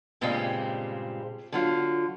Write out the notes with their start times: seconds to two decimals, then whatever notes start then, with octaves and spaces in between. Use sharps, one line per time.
0.21 G2 A#2 C#3 G3 G#3 C4
1.52 D3 F#3 F4